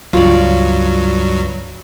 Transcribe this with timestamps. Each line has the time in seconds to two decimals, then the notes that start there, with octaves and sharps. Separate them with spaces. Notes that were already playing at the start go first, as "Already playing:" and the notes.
0.13 C#2 G2 F#3 F4 C#5 D5